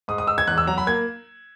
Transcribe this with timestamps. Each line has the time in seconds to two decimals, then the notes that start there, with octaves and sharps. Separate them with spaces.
0.08 G#2 D#6
0.18 D#6
0.27 G#2 E6
0.38 G#6
0.47 E2 F#6
0.58 E6
0.67 F#3 A#5
0.78 B5
0.87 A#3 G#6